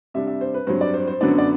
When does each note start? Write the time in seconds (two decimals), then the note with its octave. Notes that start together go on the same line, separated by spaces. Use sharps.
0.14 C3 G3 D4 E5
0.27 E5
0.41 C5
0.54 B4
0.67 G2 F#3 C4 C5
0.81 D5
0.94 C5
1.07 C5
1.21 F#2 D3 F#3 B3 D4 D5
1.38 D5